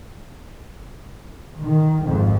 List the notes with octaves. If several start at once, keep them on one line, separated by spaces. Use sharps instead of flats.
D#3
G#1 F2